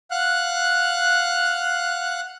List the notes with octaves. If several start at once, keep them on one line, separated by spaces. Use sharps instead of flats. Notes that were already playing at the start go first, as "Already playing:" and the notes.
F5 F#5 F#6